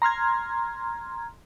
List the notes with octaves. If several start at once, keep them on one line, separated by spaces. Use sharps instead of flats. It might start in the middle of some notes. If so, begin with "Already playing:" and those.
A#5 C6 F6 G#6